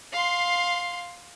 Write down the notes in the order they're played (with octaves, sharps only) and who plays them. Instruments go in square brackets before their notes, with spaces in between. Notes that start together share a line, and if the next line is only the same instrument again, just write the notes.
[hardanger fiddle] F5 C6